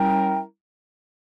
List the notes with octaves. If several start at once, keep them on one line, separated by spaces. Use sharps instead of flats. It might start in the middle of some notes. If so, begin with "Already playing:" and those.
Already playing: G3 C#4 E4 A#4 G5